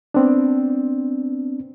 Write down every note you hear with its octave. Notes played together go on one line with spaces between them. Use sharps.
B3 C4 D4